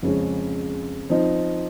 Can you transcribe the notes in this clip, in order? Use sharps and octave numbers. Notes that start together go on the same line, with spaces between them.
F2 C#3 G#3 C#4
F3 C4 D#4